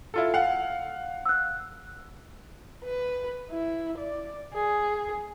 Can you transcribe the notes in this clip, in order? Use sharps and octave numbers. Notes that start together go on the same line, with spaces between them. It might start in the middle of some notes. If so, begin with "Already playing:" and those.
E4 F4 A4
F5 F#5
E6 F#6
B4
E4
D5
G#4